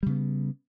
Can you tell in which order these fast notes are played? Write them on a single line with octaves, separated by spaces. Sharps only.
G3 C#3 B3